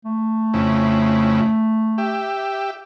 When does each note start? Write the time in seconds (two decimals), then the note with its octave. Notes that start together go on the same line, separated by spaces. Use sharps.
0.05 A3
0.54 F2 C#3 E4
1.98 G4 E5